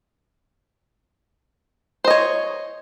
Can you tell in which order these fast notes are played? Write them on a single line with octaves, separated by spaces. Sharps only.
C5 D#5 C#5